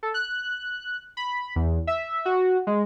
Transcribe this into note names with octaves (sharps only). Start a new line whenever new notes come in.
A4
F#6
B5
E2
E5
F#4
G#3